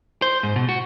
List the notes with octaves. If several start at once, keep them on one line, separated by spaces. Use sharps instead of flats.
C5
G#2
B2
F#4